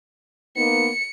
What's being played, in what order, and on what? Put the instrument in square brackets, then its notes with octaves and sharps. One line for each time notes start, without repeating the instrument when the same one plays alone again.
[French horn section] A#3 B3 D#4 [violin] C#7